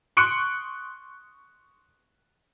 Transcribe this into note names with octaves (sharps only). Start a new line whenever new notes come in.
C6 C#6 D#6 F#6 C#7 D7